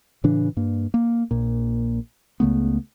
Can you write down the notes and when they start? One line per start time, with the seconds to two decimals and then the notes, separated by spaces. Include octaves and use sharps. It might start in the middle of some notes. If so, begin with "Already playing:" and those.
0.24 A2 C#3 E3 D4
0.57 G2 A#3
0.94 A#3
1.31 A#1 A#2
2.40 C#2 C#3 A3 B3